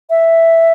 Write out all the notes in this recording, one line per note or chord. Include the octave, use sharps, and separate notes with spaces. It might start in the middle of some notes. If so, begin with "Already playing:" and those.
E5